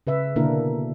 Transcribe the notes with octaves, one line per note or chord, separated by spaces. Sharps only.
C#3 B4 E5
B2 D3 A#3 D4 E4 A#4